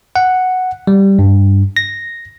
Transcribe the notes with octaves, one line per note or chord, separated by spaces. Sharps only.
F#5
G3
G2
A#6